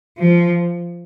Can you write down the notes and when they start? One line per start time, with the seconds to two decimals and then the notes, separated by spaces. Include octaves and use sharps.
0.18 F3